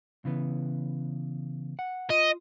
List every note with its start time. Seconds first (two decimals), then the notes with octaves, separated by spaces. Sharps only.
0.25 C#3 E3 B3
1.79 F#5
2.10 F4 D#5